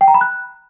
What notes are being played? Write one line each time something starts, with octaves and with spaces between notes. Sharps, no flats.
G5
A#5
B5
F#6